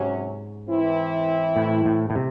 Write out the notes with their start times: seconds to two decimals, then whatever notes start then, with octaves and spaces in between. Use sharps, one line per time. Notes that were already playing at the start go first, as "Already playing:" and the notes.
Already playing: G#2 C3 F#3 C#4
0.68 E3 C4 E4
1.56 A2
1.85 A2
2.10 A2
2.15 C3